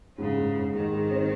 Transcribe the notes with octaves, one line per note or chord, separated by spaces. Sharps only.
G#2 C#3
G#2
G#2
G#2 D#3
G#2
C4